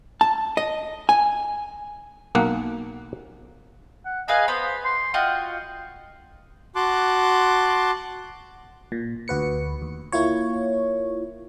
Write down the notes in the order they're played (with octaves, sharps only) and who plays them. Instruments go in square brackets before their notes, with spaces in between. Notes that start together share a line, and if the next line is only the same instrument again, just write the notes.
[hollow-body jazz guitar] A5
D#5
G#5
[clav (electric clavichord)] B1 A#3 F#5
[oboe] F#5
[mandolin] G#4 B4 F5 [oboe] D#5
[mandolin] B3 B5 [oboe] C5
[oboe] C6
[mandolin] F4 F#4 D#5 [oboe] G5
[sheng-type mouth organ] F#4 A5 C6 D6 F#6
[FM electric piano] A#2
D2 F#4 B4 C#7
D#2
A#3 E4 F4 C#5